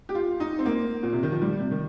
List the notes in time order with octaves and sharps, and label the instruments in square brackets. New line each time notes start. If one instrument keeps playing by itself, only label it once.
[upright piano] G4
F4
D#4
C4
A#3
A#2
C3
D#3
F3
G3
C3
D#3